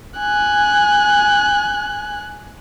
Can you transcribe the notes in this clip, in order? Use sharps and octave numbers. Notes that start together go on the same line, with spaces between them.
G#5 F#6